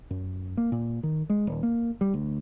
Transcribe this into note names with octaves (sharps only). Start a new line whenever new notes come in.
F#2
A#3
A#2
D#3
G#3
D#1
A#3
G3
D2